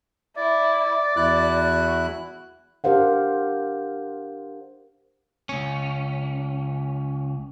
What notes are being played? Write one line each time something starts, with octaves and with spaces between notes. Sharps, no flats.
E4 D5
E2 E4 F#4 F#6
D4 G4 A#4 C5 F5 F#5
C#2 C#4